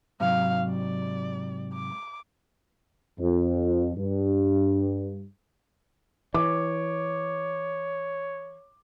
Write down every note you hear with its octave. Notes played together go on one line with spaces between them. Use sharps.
G#2 C3 F#3 F5
D5
D6
F2
G2
E3 C#5 D6